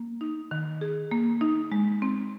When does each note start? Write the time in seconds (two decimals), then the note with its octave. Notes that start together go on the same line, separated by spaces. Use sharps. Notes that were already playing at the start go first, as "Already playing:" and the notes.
Already playing: A#3
0.21 D#4
0.51 D#3
0.81 G#4
1.11 A#3
1.41 D#4
1.72 G#3
2.02 C4